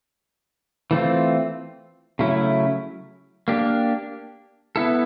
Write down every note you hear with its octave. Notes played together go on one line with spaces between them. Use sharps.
E3 A3 C4 F4
C#3 F#3 A3 C#4 E4
A#3 D4 G4
B3 E4 A4